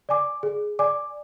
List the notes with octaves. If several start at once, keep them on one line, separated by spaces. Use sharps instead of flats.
D5 G#5 D6
G#4
D5 G#5 D6